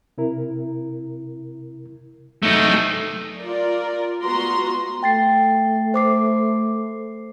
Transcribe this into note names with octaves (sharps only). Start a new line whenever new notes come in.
C3 E4 A#4
C3 F#3 A3 D#4
F4 A#4 D5
B3 F4 F#4 A#5 C6
A3 G5 A6 C7
C5 D6 C7